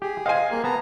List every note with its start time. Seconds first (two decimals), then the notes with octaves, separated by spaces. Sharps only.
0.02 G4 G#4
0.26 C5 D#5 F5 G#5
0.51 A#3
0.64 B3 A5 A#5